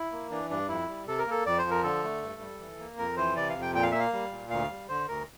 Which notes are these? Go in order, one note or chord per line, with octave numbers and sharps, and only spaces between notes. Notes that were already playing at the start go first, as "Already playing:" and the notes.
Already playing: E4
A#3
E3 D4
G2 D4
F2 E4
G3
C3 A4
A#4
A#3 A4
F2 D5
C5
F3
A#4
D3 A4
A3
G2
G3
E3
A#3
F2 A#4
E3 C5
C3 D5
F5
F2
G5
A#2 G5
F5
A#3 E5
F5
G3
A#2
D2 F5
G3
D3 C5
D2 A#4